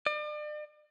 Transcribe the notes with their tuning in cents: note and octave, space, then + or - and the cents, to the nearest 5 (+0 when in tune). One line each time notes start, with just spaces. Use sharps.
D5 +40